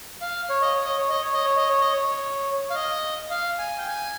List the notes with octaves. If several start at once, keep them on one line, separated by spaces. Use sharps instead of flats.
F5
C#5
D#5
C#5
D#5
C#5
D#5
C#5
D#5
C#5
D#5
C#5
D#5
C#5
F5
D#5
F5
G#5
G5
G#5